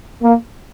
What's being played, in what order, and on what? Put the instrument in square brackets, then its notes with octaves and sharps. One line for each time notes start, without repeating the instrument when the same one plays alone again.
[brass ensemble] A#3